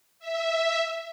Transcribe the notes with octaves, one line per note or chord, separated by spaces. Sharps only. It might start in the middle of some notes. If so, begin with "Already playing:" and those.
E5